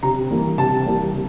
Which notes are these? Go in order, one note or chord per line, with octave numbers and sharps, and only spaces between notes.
C3 A#5
E3 G3 A#3
C3 A5
E3 G3 A#3
C3